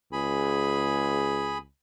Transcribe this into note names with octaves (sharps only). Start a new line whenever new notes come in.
C#2 G#4 G#5 B5